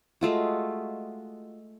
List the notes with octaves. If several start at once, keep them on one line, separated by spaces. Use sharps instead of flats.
G#3 A3 F4 F#4